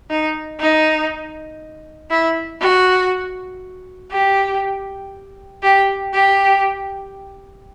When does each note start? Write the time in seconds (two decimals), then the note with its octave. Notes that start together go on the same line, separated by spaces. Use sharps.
0.10 D#4
0.60 D#4
2.11 E4
2.61 F#4
4.12 G4
5.63 G4
6.14 G4